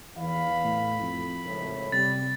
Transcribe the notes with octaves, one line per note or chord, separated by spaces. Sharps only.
E2 E3 F5 B5
A2
F2
G#1 C#2 A2
C3 G3 A6